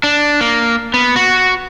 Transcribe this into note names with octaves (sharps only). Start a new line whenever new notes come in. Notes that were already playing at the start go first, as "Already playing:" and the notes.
D4
A#3
B3
F#4